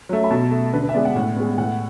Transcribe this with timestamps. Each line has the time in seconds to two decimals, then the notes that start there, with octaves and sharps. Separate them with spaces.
0.09 F#3 A3
0.24 B5
0.30 B2 A5
0.51 A3
0.73 D3 B4
0.83 B4
0.89 E5
0.94 G#3 B3 D5
1.05 F#5
1.15 A2
1.37 G#3 B3
1.58 A2 F#5